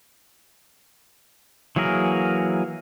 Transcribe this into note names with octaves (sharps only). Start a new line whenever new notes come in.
E3 F#3 A#3 G#4 A#4